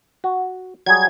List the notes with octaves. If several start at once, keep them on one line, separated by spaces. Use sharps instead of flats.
F#4
F#3 G3 G#4 G#6